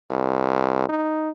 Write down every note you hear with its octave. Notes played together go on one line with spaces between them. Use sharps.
C2
D#4